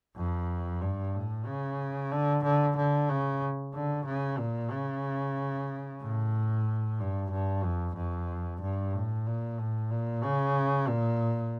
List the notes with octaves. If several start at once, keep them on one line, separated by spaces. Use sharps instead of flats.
F2
G2
A2
C#3
D3
D3
D3
C#3
D3
C#3
A#2
C#3
A2
G2
G2
F2
F2
G2
A2
A#2
A2
A#2
C#3
A#2